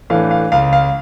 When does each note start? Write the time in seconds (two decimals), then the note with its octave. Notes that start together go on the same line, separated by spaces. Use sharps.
0.10 A2 E3 A3 D4 F5
0.31 F5
0.52 C#2 F5
0.73 F5